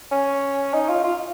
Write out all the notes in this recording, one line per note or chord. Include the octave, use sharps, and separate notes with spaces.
C#4
D#4
F4
F4